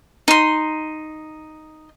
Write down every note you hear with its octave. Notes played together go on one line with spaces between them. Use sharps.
D#4 C6